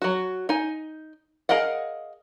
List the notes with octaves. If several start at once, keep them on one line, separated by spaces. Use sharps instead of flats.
F#3 F#4
D#4 G#5
G#4 A#4 D#5 F5 F#5